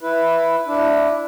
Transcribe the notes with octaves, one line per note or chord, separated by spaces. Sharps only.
E4 B4
D4 E4